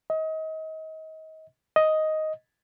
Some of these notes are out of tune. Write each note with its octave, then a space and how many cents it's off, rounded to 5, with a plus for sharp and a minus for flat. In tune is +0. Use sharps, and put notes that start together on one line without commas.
D#5 +30
D#5 +5